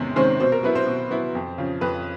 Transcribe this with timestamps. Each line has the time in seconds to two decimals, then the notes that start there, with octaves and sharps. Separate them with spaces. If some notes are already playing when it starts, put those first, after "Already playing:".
Already playing: E2 C3 D#3 G#3 C#4
0.16 C3 D#3 G#3 C4 C#4 C5
0.40 B2 C4 C5
0.52 A#4
0.63 F#3 B3 E4 B4
0.75 C4 C5
0.87 B2
1.10 F#3 B3 E4
1.35 F2
1.58 C#3 F3
1.81 F2 B4